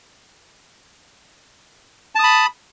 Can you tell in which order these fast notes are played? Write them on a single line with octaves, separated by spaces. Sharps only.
A5 D#6 B5